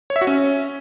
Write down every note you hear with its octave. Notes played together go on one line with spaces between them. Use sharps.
C#5
E5
F#4
C#4